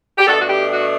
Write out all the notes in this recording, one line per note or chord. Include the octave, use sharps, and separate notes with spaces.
G4
B2 A3 D4 F#4 A4
F#4
G4
F#4